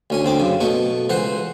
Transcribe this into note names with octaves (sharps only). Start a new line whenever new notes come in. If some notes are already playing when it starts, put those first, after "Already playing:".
D2 C#4 G#5
D2 C4 D6
F#2 C#3
B2 A3 C#6
C#2 E3 C5 F#5 C6